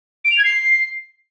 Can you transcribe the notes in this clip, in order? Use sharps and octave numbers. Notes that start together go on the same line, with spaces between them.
D7
F7
G#6
C7